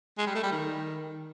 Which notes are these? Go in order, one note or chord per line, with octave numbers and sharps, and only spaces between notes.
G#3
G3
A3
G3
D#3